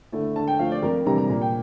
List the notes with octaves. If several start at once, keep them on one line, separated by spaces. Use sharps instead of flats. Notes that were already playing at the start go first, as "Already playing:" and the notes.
D3 A3 E4
D3 A5
G5
F3 A3 F5
D5
F2 A#4
C3 E3 G3 D4 A#5
A#5
A#2
G5